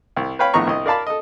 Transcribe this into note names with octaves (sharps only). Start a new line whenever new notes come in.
C2
B4 C#5 F5 G5 B5
A#1 A2 B3 A#5 C#6
C2 D#5
A#4 D5 F5 A5 B5
A4 D#5